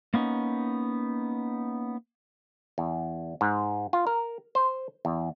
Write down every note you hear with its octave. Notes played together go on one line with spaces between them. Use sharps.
A#3 B3 C#4 D#4
E2
G#2
F4
A#4
C5
E2